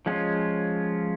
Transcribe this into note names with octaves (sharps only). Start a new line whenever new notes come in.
F3 G#3 C#4 F4